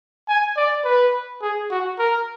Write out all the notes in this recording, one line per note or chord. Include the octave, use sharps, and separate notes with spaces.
G#5
D5
B4
G#4
F#4
A#4